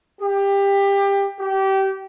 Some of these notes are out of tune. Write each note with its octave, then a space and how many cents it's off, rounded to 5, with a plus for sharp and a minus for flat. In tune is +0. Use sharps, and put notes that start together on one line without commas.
G4 +20
G4 -25